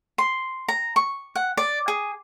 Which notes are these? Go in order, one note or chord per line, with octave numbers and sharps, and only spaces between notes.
C6
A#5
C#6
F#5
D5
G#4